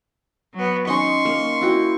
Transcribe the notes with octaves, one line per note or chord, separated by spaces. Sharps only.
F#3 B3
C#4 D#4 D#5 C6 C#6
A#3
E4 F#4 G5